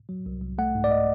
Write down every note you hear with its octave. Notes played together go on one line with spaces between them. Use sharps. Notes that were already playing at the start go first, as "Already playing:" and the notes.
F#3
C2
C2
A3 F#5
G#2
D5
D#5